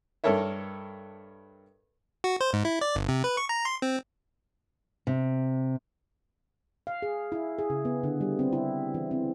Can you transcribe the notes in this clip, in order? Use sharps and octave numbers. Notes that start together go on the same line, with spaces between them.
G2 A4 A#4 C#5 E5
F#4
C5
G#2
E4
D5
G1
C3
B4
C#6
A#5
C6
C4
C3
F5
G#4
E4
G#4
C#3
B3
D3
G3
C4
E4
E3
C4